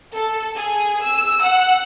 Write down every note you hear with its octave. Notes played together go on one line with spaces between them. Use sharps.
A4
G#4
E6
F#5